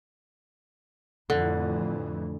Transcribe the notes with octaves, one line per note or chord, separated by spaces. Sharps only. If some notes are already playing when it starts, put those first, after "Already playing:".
F2 A2 D3 E3